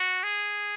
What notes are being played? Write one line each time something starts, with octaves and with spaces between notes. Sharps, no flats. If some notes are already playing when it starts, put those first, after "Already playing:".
Already playing: F#4
G#4